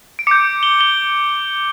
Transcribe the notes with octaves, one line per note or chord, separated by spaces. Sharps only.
D7
D6 G6 C#7
G7
G7